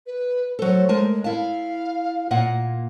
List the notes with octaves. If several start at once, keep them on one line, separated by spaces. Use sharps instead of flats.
B4
F#3 A4 C5
G#3 A#4 A5
E4 F5 A5
A#2 A#3 F#5